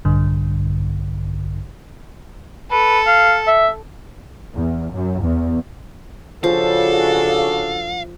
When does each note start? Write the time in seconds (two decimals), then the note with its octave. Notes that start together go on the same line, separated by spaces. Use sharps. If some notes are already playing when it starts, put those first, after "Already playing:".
0.05 A#1 G2 D3
2.71 A4 B4
3.06 F5
3.47 E5
4.55 E2
4.93 F#2
5.22 E2
6.44 C#3 F3 D4 F#4 A4 F5